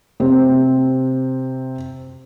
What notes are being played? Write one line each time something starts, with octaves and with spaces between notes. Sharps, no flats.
C3 C4